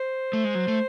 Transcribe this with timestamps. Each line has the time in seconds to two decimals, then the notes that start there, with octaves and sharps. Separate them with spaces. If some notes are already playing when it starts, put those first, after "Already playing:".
Already playing: C5
0.33 A3
0.44 G#3
0.55 F#3
0.68 A3